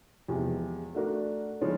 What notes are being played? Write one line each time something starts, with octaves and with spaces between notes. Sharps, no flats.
E2 C3 F3 G#3
A3 D4 F#4 A#4
C#3 F3 G#3 C#4